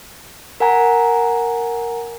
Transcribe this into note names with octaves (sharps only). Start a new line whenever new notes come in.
A#4 F#5 G#5 A#5